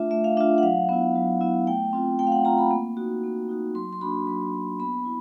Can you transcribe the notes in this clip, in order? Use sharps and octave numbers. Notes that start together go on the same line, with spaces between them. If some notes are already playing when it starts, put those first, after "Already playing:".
Already playing: A3 D4 F4 E5
A3 E5
F5
D4 F4 E5
F#5
F#3 F5
B3 E4
F#3
B3 E4
A3 G5
C4 F4
A3 G5
F5
F#5
C4 F4 A#5
B5
A#3
D#4 F#4
A#3
D#4 F#4
F#3 C6
C6
A#3 D4 F#4 B5
F#3 C6
A#3 D4 F#4
B3 B5
E4